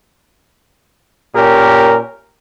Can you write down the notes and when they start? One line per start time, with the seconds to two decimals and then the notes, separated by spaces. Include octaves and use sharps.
1.35 A#2 C#4 G4 A#4